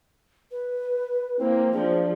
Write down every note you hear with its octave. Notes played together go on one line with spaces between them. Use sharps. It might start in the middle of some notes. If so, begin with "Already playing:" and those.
B4
A#3 C4 E4
F3 D4 G#4